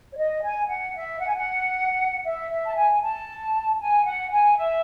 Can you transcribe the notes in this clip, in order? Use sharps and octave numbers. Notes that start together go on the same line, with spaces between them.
C#5
D#5
G#5
F#5
E5
F#5
G#5
F#5
E5
E5
A5
G#5
A5
G#5
F#5
G#5
E5